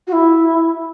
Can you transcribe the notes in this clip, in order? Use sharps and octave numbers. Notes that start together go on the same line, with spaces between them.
F#4
E4